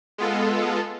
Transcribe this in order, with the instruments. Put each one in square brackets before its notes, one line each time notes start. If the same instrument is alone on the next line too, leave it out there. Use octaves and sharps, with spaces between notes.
[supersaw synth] G#3 B3 F4 A4